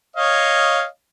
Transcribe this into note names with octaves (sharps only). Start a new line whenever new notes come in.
C#5 D#5 F5